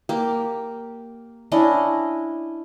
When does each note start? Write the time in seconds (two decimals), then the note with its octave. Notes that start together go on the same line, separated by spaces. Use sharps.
0.09 A#3 G4
1.52 C#4 D4 E4 D#5